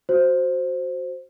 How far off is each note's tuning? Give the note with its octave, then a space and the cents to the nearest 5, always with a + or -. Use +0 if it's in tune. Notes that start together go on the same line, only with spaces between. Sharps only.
F#4 +0 C5 +0